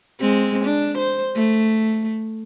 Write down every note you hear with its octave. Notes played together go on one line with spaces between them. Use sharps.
G#3 C4
D4
C5
A3